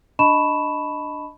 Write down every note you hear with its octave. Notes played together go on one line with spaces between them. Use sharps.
D4 D#5 A5 B5 C#6 E7